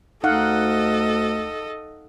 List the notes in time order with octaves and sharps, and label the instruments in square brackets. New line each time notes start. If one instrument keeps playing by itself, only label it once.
[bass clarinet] D2 [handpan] D#4 F5 F#5 [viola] A4 D#5